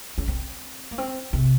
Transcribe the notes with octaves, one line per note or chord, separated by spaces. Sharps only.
C#4
C4
A#3
C4
C3